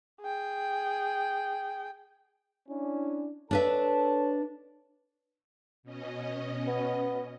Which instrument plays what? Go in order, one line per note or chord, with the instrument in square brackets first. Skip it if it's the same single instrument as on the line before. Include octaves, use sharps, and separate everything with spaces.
[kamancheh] G#4 G5
[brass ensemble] C#4 D4 E4
[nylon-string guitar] D4 B4 E5 [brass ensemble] A4 C#5 A5
[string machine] B2 C#4 D#5
[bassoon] B3